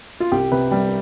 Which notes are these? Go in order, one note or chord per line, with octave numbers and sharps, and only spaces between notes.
F4
C2 G4
C3 B4
G3